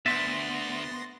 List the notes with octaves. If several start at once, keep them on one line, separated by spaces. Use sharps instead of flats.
D2 B3 E5 C6 A6 A#6